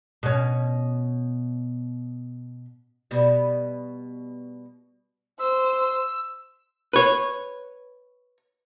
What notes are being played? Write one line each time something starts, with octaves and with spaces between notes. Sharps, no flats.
B2 C#4
B2 G3
C5 E6
B4 C#5